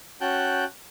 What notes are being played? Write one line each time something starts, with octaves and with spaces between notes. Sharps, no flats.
C#4 F#4 G5 A5 F#6 G6